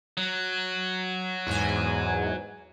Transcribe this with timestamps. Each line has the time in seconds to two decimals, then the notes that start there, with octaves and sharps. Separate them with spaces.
0.17 F#3
1.47 E2 G#2 G#5